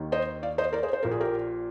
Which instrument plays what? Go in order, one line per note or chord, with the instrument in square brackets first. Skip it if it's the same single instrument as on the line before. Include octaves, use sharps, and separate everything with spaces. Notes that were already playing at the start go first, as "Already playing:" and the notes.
Already playing: [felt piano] D#2 D#3
C5 D#5
D5 F5
C5 D#5
A#4 D5
G#4 C5
C5
A#1 A#2 A#4
G#4
G4 A#4